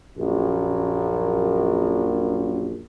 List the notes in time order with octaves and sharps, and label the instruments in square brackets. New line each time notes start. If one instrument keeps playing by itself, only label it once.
[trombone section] A#1 F#2